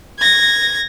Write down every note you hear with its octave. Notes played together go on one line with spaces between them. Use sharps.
G#6 A#6